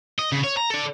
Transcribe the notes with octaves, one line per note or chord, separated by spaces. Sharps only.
D#5
C#3
C#5
A#5
A4 D5